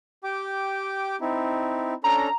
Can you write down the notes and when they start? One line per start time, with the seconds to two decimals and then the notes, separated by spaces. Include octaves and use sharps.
0.24 G4 G5 D6
1.21 C4 D#4 E4
2.04 C#4 D4 A4 A#5